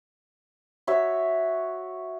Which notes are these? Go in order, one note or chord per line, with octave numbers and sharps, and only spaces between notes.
F#4 C#5 E5